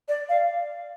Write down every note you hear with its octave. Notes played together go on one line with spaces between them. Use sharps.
D5
F5